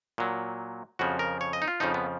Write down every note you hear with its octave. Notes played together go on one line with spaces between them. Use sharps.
A#2 F#3
F2 C#3 F3 F#4
A#4
C#5
D#5
D#4
F4
F2 C#3 F3 D#4
B3